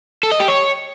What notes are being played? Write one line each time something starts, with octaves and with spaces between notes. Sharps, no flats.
A4
D#5
G4
C#5